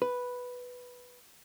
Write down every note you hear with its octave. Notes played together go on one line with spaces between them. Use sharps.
B4